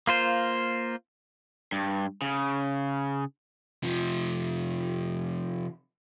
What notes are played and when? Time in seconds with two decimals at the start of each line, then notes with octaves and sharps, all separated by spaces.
0.07 A#3 F4 C5
1.72 G2
2.22 C#3
3.83 C3 F3